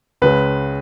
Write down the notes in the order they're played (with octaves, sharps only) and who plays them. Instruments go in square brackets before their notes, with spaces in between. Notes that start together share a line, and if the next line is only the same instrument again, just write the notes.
[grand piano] C#2 C#3 G#3 C#4 B4